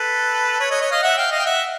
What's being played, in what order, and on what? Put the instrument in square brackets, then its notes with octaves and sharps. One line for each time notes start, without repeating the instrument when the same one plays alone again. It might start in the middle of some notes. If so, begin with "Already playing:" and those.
Already playing: [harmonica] A4 B4
B4 C#5
C#5 D#5
C#5 D#5
D#5 F5
E5 F#5
F5 G5
D#5 F5
G5
E5 F#5